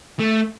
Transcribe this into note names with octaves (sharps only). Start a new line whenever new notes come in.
A3